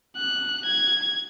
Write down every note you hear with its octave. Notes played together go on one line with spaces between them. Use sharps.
F#6
G#6